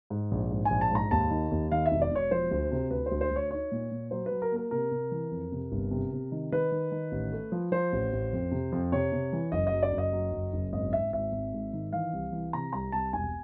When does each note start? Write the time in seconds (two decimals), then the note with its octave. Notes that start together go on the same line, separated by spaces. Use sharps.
0.10 G#2
0.31 A#1
0.51 G#2
0.65 G#5
0.70 A#1
0.81 A5
0.91 G#2 A#5
1.11 D#2 A5
1.31 D#3
1.51 D#2
1.71 D#3 F5
1.86 E5
1.92 E1
2.02 D5
2.11 E1 C#5
2.31 F3 C5
2.51 D2
2.72 C3
2.91 D2 B4
3.06 C5
3.12 D2
3.21 C5
3.31 D2
3.36 C#5
3.51 D#4 C#5
3.72 A#2
3.91 A#2
4.11 F#3 C5
4.26 B4
4.31 F#3
4.42 A#4
4.52 A#3 A#4
4.71 C3 A#4
4.91 C3
5.11 E3
5.31 F2
5.52 C3
5.72 G1
5.91 C3
6.12 C3
6.32 D#3
6.52 D#3 B4
6.72 D#3
6.92 D#3
7.12 A1
7.33 A3
7.52 F3
7.72 F3 C5
7.93 A1
8.13 A1
8.33 F2
8.52 C3
8.72 F2
8.92 C3 C#5
9.12 C3
9.33 E3
9.52 F#1 D#5
9.67 D#5
9.73 F#3
9.83 D5
9.92 F#1
9.98 D#5
10.13 F#3
10.32 F#1
10.53 F#1
10.73 G#1 D#5
10.93 G#1 E5
11.13 G#1 E5
11.32 G#1
11.53 G#2
11.73 D#3
11.92 E3 F5
12.13 C2
12.32 E3
12.53 C3 A#5
12.73 C2 A#5
12.92 C2 A5
13.13 E1 G#5